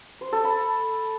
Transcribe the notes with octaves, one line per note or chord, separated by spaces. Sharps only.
C5
A4
B5